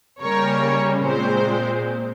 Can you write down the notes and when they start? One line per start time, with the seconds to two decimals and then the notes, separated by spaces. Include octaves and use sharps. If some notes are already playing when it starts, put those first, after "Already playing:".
0.21 C#3 G3 A#3 C#4 A#4 C#5
1.05 A#2 G#3 C4 C5